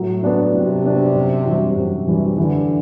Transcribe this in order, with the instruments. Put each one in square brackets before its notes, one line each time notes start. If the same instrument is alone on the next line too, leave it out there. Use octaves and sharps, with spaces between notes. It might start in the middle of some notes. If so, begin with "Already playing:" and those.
Already playing: [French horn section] A2 [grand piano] F#3
[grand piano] B3 D4 F#4
[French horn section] C3 [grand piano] F#3
[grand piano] B3 D4 F#4
F#2
E3 G3 D4 F#4
[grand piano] F#2 [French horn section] C3
[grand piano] E3 G3 D4 F#4
[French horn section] D3 [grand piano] E3